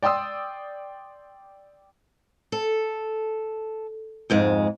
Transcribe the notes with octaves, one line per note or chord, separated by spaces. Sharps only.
D5 G5 C6 D#6 E6
A4
F2 G#2 G#3